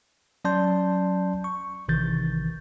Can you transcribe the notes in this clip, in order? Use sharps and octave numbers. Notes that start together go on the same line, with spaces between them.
F#3 C#4 D5 A5 C6 G6
C#6
A1 C3 D#3 E3 G6 A6